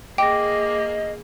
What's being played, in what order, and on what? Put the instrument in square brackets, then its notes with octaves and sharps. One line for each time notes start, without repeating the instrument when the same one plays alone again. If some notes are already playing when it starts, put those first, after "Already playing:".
[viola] A#3 G#4 [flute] D#5 [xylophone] G5 [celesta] D6 A#6